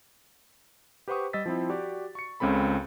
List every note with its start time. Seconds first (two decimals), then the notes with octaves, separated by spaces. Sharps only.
1.08 G4 B4 C5 F#5 C#6 D#6
1.33 G3 D#5 E6 A6 B6
1.46 F3 C4 E4
1.70 F#4 G4 D5
2.15 C#6 C#7
2.40 C#2 C#3 C4 A4 B5